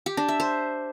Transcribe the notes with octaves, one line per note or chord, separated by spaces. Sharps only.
G4
D4
E5
C5